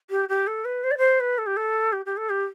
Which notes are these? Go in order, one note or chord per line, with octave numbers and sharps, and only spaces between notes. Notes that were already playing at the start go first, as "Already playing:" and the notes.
G4
G4
A4
B4
C5
D5
C5
B4
A4
G4
A4
G4
G4
A4
G4